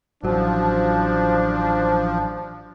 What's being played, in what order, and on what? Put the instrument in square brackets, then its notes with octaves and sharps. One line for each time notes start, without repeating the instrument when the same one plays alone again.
[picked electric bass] A1 F#3 [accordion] F3 [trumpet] D4